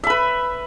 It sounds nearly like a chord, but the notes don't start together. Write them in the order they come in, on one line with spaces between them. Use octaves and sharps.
E5 B5 B4